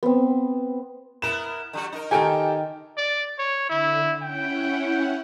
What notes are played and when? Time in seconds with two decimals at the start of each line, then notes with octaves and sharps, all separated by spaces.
0.03 B3 C4
1.22 B3 E4 A#4 E7
1.73 D3 G3 F#4
1.93 D#4 A#4
2.11 D#3 G4 A4 G5 G#5
2.97 D5
3.39 C#5
3.69 D3 E4
4.22 C#4 E4 F#5 G5